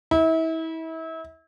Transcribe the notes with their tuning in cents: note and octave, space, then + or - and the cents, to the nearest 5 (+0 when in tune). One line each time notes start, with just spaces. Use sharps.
E4 -35